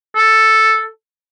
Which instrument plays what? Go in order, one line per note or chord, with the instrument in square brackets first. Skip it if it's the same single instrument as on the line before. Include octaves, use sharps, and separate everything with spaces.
[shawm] A4